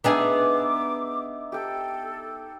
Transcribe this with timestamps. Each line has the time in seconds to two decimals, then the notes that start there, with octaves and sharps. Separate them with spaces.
0.04 B3 D4 D#4 G#4 E5 D6
1.52 G4 A4 G5